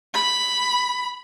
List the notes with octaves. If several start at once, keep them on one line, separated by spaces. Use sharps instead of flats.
B5